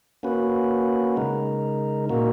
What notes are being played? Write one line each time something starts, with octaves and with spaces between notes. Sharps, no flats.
A#3 C#4 F#4 B4
C#3 G#3 D#4 A#4
A#2 A#3 D#4 F#4 A#4